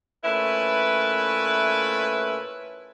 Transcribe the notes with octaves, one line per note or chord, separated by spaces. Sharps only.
A#2 A3 C#4 E4 B4